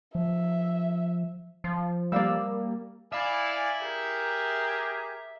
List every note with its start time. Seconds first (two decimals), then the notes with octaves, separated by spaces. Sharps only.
0.15 F3 E5
1.64 F3
2.12 G3 A#3 D5 F5 E6
3.12 D5 E5 F5 G#5 B5
3.82 G4 G#4 A#4